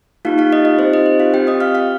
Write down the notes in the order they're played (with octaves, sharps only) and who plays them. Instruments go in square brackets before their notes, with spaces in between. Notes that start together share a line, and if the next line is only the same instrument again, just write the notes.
[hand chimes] A#3 D#4 F4 G4 F5
F4 F5
D#5
D#5
C4 D#4 G4 C5
D#5
C5
F4 F5
C4 F4 G4 G5
D#5 D#6
F5 F6
F5 F6